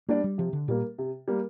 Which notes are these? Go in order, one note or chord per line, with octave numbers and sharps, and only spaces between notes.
G3 A#3 D4 G4 D5
G3
C3 F3
D3
A#2 G3 A#3
C3
G3 A#3